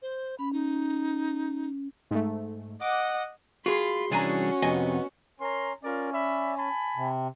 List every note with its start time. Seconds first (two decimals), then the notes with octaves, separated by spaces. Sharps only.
0.02 C5
0.39 C#4 B5
0.53 D#4
2.11 G#2 A3
2.81 D#5 F#5 D6
3.66 F4 F#4 G#4 B5 C6
4.11 C2 E3 C#4 D4 F#4 G#4 G#5 A#5
4.62 F2 C3 B3 D#5 G#5
5.40 C#4 A#4 A#5 C6
5.83 C#4 F4 A#4 D5
6.12 D5 E5 B5
6.57 G#5 A5 B5
6.96 C3